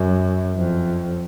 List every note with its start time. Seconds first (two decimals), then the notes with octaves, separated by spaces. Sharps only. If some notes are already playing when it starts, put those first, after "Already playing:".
Already playing: F#2
0.57 F2